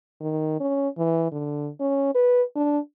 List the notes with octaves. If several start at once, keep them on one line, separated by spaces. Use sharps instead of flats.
D#3
C#4
E3
D3
C#4
B4
D4